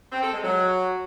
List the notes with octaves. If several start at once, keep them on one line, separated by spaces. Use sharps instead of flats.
C4
A4
G#3
F#3